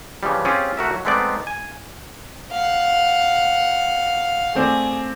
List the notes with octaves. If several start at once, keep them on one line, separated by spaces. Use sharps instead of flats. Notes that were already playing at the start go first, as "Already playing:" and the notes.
C#3 E3 F3 G3
C4 C#4 F4 G4 G#4
A3 F#4 A#4 E5
F#3
G#3 A3 B3 C4 D#4 D5
G#5
F5 F#5
A3 C4 G#4 D5